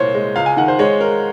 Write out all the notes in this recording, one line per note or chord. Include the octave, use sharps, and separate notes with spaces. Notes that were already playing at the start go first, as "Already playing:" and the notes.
Already playing: C2 A#2 C5 C#5
G#3
C#2 F5
G#5
D#3 F#5
C5
G#3 C#5
A#4